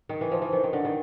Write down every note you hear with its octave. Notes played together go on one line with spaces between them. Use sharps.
D#3
E3
F3
E3
D#3
D#3
D3
D#3